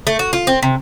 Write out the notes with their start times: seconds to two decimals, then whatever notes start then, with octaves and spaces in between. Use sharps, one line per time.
0.07 A3
0.19 F#4
0.33 F4
0.47 C4
0.63 C3